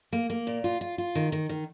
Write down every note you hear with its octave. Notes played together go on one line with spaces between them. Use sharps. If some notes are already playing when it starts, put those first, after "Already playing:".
A#3
A#3
A#2
F4
F4
F4
D#3
D#3
D#3